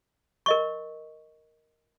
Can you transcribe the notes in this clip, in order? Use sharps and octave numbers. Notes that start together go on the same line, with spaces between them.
A#4 D#5 C#6